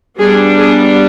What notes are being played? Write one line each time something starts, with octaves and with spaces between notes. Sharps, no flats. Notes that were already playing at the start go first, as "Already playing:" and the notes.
G3 B3 D4 G#4
G#4